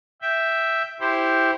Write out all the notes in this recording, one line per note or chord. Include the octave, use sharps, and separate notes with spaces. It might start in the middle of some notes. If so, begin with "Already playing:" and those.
E5 G5
E4 G4 C5